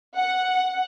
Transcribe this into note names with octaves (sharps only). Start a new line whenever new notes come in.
F#5